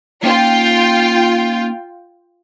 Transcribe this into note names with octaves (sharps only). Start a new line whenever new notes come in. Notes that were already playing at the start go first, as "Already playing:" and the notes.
A#3 C#4 D#4 F4 G5